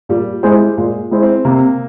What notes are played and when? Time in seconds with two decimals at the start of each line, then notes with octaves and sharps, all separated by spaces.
0.09 A#2 G3
0.43 G#3 E4 G#4 C5
0.77 A#2 G#3
1.11 G#3 E4 G#4 C5
1.23 C4
1.45 C3 A#3